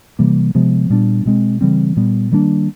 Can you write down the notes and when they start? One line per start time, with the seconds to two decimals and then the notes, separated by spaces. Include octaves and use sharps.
0.19 C3 E3 G3 A#3
0.55 C3 F3 G#3 B3
0.90 A#2 G3 B3 D4
1.25 B2 G#3 C4
1.61 C#3 E3 G3 C4
1.96 A#2 G3 B3
2.32 D#3 G3 A#3 D4